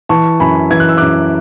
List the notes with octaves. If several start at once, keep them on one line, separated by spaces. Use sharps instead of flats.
E3 A5 C#6
F#2 G#5 B5
E3 G#6
F#6
E6
F#2 D6 F#6